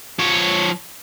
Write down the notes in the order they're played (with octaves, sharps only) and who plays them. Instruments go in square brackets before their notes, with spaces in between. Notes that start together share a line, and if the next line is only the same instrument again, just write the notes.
[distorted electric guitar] F3 C#5